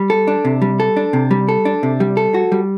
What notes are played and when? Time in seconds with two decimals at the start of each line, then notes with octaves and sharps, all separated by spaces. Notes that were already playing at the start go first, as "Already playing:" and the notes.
Already playing: G3
0.10 A4
0.28 D4
0.45 C3
0.62 G3
0.80 A4
0.97 D4
1.13 C3
1.31 G3
1.49 A4
1.65 D4
1.83 C3
2.00 G3
2.17 A4
2.34 F#4
2.52 G3